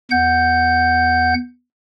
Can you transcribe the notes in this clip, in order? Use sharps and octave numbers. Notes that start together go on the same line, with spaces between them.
E2 F#5 G6